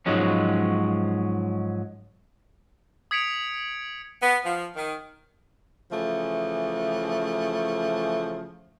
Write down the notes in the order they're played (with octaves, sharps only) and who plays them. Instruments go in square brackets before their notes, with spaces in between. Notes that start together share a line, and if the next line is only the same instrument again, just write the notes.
[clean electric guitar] G#2 F3 F#3 G#3 C#4
[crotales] D#6 G#6 B6 C#7 D7 F7
[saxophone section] B3
F3
D#3
C#3 E3 F3 A3